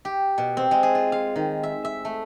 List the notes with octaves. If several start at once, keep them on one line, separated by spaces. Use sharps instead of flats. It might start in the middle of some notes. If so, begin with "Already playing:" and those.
G4
B2
C4
G#3
G#4
F4
F5
D#3
E5
E5
A3